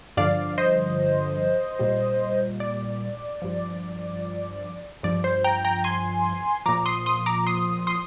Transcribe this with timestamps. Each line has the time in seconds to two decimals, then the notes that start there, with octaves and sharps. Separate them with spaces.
0.17 G2 D3 F3 D5 F5
0.58 C5 D#5
1.79 A#2 G3
2.60 D5
3.42 G2 F3
5.03 G2 F3 D5
5.24 C5
5.44 G5 A#5
5.65 G5 A#5
5.84 G#5 C6
6.66 A#2 F3 A#5 D6
6.86 C6 D#6
7.06 C6 D#6
7.26 A#5 D6
7.47 C6 D#6
7.87 C6 D#6